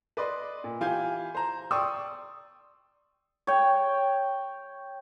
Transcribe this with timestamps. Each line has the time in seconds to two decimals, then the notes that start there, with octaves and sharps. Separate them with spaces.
0.17 B4 D5 D#5 C6
0.64 A#2
0.81 E3 F4 G4 G#5 G6
1.35 C5 A#5
1.71 D5 G5 C6 C#6 D#6 E6
3.47 C#5 G5